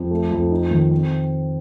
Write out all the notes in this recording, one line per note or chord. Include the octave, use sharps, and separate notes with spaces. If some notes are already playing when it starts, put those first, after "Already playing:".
Already playing: F2
A3
F2
D#4
D#3
C4